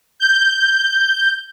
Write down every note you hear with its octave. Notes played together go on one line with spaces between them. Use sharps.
G6